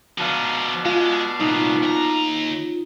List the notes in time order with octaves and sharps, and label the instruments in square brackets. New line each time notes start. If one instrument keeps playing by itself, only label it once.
[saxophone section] B2 D4 F5 [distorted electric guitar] F3 D#4
[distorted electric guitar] G#3 [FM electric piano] F4
[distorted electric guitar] C2 A#2 [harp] D#4
[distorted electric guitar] D#2 A#5